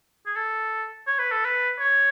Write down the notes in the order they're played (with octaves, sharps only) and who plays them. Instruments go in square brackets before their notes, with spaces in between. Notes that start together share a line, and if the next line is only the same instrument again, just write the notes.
[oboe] G#4
A4
C#5
B4
A4
B4
C#5